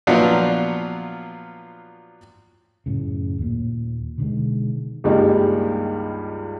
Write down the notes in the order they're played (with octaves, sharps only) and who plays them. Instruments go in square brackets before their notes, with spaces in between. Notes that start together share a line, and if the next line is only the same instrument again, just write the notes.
[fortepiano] A#2 F3 F#3 B3 D4 F4
[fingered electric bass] F#2 A2 C#3
D#2 A#2
B2 D3 D#3 G#3
[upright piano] C#2 G2 D#3 G3 G#3 A#3